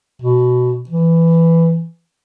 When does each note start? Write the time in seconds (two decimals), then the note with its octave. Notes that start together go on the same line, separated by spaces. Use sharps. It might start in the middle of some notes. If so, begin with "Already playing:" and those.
0.22 B2
0.89 E3